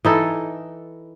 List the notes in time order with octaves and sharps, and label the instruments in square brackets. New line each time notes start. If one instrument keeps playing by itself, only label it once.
[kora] E3 D#4 A4